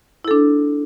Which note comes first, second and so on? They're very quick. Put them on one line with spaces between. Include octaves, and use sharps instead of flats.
E4 A4 D4